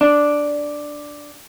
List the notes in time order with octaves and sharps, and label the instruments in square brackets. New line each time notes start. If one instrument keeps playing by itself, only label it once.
[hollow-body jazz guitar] D4